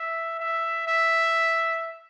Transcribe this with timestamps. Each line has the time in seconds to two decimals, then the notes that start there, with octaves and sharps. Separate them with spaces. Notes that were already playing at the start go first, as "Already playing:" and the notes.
Already playing: E5
0.40 E5
0.88 E5